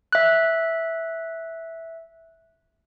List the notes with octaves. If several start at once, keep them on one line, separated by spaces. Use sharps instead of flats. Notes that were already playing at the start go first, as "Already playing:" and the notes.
E5 F#6